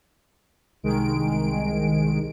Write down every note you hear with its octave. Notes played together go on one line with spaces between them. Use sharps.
C2 D#3 G#3 D7